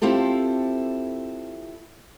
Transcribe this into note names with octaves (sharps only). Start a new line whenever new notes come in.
C4 E4 F4 G4 A4